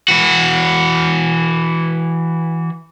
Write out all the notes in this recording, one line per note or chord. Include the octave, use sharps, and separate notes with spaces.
E3 F#4